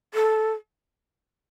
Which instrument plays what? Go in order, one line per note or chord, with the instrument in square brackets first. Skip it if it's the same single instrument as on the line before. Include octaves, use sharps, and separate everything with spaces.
[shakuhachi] A4